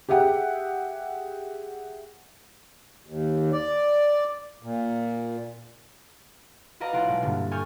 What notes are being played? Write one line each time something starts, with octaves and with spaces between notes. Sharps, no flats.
G4 G#4 E5 F#5 G5
D#2
D5
A#2
F#4 B4 D5 D#5 F5 A#5
B1 E4 F4 F#5 C6 D7
B2 G#3
G2 A#2 D3
A4 G#5 C#6 D#6 F6 G6